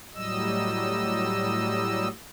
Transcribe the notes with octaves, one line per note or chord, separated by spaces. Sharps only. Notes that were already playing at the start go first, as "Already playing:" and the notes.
A2 F#3 G3 D#5 E6